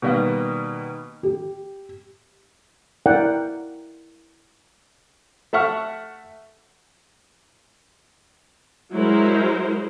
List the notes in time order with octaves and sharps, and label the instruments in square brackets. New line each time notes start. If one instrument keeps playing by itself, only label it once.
[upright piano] B2 D#3 G3 A#3 B3
[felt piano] G4
[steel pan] E4 A#4 D5 F#5 G5
[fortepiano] A3 E5 F#5 C#6 F6
[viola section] F#3 G#3 E4 A#4 C5